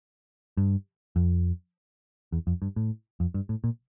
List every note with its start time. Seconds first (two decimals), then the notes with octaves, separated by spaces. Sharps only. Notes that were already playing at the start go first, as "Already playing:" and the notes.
0.57 G2
1.16 F2
2.32 E2
2.47 F2
2.62 G2
2.76 A2
3.20 F2
3.34 G2
3.49 A2
3.64 A#2